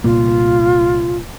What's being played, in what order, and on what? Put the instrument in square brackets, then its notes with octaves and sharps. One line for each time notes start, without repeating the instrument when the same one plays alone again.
[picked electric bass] C2 A#2 A#3 [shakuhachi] F4